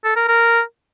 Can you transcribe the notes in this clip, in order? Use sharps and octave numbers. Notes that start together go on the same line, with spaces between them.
A4
A#4
A#4